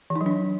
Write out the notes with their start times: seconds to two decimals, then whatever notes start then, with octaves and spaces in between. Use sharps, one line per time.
0.10 E3
0.16 D#4
0.21 F#3
0.26 D4